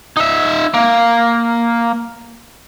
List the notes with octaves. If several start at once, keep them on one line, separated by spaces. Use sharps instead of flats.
D#4 E5
A#3